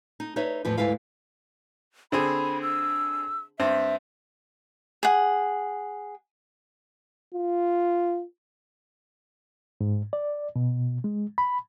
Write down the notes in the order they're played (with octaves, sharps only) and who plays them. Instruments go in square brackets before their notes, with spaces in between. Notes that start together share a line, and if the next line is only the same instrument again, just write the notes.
[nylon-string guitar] D#4
D#4 B4 C#5 E5
E2 A2 F3 B4
D2 G#2 G#3 E4 B4 F5
[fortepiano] D3 C4 G#4 [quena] B5
[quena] E6
[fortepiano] G2 C4 [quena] E5
[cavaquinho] G#4 F#5
[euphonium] F4
[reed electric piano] G#2
D5
B2
G#3
B5